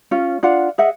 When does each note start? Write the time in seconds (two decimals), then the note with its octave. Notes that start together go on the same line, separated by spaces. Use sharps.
0.11 C#4 F4
0.43 D4 F4 F5 F#5
0.78 G#4 D#5 E5 F#5